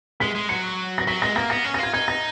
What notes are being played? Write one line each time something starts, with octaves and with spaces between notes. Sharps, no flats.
G#3 B6
G#3
F#3 C#7
A#6
F#3 B6
G#3 A#6
A#3 A#6
B3 A#6
C#4
A#6
F4 G#6
D#4 G#6
A#6